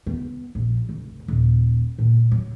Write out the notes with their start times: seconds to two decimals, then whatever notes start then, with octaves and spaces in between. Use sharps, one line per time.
0.06 B3
0.55 A#1
0.89 F1
1.28 D#1
1.98 A#2
2.31 F#3